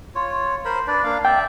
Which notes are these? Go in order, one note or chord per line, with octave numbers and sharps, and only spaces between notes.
F4 C#5
A#4 C5 B5
D4 B4 D5
A#3 D4 F5
D5 E5 G5